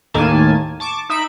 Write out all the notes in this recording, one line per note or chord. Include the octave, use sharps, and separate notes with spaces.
D#2 A2 D#3 A#3 G#5 A5
A5 C#6 D6
D#4 E5 B5 D7